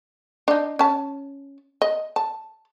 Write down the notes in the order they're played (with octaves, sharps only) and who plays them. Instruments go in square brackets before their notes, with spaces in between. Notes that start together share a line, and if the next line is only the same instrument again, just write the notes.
[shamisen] D4 D#4
C#4 A5
D#5
A5